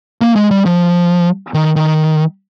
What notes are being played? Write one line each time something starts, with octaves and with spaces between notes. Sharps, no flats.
A#3
G#3
G3
F3
D#3
D#3